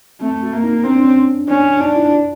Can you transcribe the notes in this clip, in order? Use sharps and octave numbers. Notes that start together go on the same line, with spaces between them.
A3 C4
F#4
A#3
D#4
C4 D4
D4
C#4
C#4 D4
D4 D#4
E4
F4